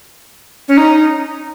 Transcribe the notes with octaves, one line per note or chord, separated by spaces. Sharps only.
C#4
D#4